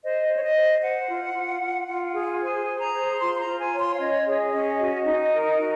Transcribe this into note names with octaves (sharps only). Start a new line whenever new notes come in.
C5 D#5
C5
C#5
D#5
C5
C5 F#5
F4
F4
F4
F4
G#4
C5 G#5
G#4
A#5
C5
F4 C6
C6
A#5
F4
G#5
C#5
C6
F5
C#4 D#5
G#4
C#4
F#4
D#4
A#4
F#4